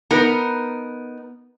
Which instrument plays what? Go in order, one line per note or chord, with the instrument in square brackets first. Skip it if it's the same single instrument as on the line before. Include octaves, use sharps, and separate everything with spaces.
[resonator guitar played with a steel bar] B3 D#4 A#4